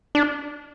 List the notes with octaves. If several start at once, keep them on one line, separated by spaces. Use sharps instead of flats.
D4